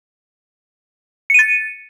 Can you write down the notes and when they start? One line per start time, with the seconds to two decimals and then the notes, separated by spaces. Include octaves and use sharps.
1.30 C#7
1.34 D#7
1.39 A6